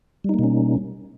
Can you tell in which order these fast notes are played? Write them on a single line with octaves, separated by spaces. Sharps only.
G3 D#4 A#3 B2 C#4